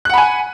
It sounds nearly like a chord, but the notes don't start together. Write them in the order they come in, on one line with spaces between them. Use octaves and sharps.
F#6 F#5 B5 G#5